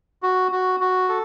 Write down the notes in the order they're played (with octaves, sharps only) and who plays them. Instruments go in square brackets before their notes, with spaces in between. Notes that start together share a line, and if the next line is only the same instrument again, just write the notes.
[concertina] F#4
F#4
F#4
A4